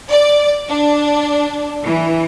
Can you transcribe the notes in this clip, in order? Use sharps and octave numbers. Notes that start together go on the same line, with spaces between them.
D5
D4
E3